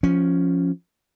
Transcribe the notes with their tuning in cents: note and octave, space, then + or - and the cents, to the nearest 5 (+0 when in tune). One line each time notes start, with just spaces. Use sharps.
F3 +0 C#4 +0